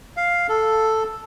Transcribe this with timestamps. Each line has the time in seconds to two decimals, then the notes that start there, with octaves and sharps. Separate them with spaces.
0.17 F5
0.49 A4